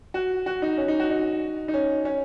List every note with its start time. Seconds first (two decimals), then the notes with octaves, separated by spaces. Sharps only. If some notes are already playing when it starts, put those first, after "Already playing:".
0.14 F#4
0.46 F#4
0.62 D#4
0.77 C#4
0.88 D#4
1.00 F#4
1.10 D#4
1.68 D#4
1.74 C#4
2.05 C#4